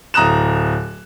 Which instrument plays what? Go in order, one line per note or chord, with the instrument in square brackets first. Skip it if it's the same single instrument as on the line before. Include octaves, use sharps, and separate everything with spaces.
[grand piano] D1 A#5 D#6 F#6 E7